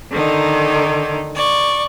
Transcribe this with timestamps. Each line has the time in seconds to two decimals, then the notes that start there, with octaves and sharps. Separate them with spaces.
0.12 D3 D#3 D#4
1.35 D5 C#6